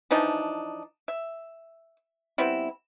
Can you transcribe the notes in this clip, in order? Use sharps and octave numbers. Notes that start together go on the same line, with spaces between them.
E3 F3 D4 D#4
E5
G3 B3 C4 E4